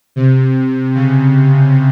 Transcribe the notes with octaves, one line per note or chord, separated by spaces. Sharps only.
C3
C#3